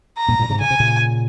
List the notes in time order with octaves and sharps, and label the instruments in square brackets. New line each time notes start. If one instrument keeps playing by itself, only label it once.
[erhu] A#5
[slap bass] G2 A#2
G2 A#2
G#2 C3
[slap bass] C#3 [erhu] G#5
[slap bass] C3
A#2 C#3